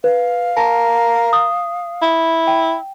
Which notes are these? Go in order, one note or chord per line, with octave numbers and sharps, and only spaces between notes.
B4 F5
A#4 A5
D#6
E4
G5